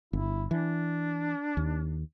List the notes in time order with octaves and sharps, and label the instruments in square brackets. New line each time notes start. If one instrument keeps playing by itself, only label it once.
[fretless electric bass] G1 [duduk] E4
[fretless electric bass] E3 [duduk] D4
[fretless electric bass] D#2